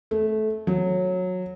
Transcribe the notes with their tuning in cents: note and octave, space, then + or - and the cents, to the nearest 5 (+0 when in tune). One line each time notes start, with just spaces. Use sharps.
A3 -20
F#3 -15